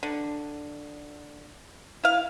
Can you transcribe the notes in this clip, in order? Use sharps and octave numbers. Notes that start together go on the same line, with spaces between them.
D3
E4 F5